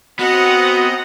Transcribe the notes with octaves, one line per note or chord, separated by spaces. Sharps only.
B3 C4 F#4 D#5 F#5 A#5